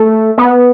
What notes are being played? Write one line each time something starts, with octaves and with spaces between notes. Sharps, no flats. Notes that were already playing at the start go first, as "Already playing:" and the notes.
Already playing: A3
B3